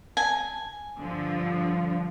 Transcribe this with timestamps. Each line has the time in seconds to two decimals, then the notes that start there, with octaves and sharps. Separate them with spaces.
0.17 G#5
0.97 G2 D3 F3